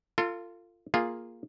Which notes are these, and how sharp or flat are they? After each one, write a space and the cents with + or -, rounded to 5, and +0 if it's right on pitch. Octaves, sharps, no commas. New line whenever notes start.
F4 -10 A4 +35
A#3 +0 F4 +0 G#4 +0